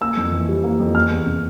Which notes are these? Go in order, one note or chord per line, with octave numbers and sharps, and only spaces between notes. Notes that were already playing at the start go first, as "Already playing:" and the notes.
A#3 E6
F2
E3
G3
A#3
F2
A#3 F6
E2
C3